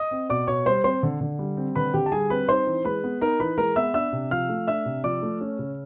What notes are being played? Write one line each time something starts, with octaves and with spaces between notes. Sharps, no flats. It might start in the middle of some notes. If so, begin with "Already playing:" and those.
Already playing: D#5 D#6
C4
B2 D5 D6
B2 C#5 C#6
G3 C5 C6
C4 C5 C6
D3
D3
G3
C4
D3 B4 B5
D3 G4 G5
A5
G3 G#4 G#5
C4 B4 B5
D#4 C5 C6
E3
G#3 B4 B5
B3
D#4 A#4 A#5
E3 B4 B5
G#3 A#4 A#5
B3 E5 E6
D4 E5 E6
C3
F3 F5 F6
A3
D4 E5 E6
C3
F3 D5 D6
A3
C#4
C#3